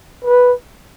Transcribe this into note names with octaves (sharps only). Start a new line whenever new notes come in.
B4